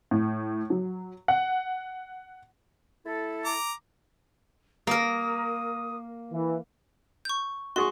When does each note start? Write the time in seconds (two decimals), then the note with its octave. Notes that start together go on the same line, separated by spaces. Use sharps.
0.11 A2
0.70 F#3
1.28 F#5
3.06 A3 E4 A4
3.45 A#5 D6
4.87 A#3 A#4 D#6
6.32 E3
7.25 C#6 G6
7.76 F#4 G#4 C6 C#6